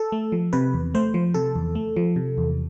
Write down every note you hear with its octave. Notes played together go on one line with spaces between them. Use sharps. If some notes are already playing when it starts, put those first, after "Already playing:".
Already playing: A4
A3
F3
C3 B4
E2
A3 C5
F3
C3 A4
E2
A3
F3
C3
E2